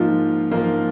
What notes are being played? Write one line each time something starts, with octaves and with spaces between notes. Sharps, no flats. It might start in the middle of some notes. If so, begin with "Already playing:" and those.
Already playing: G#2 F3 A#3 F4
G#2 F3 A#3 F4